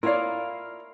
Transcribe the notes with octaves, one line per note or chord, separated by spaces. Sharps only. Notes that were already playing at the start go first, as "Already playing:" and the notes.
E4 F4 A#4 C#5 D5 F5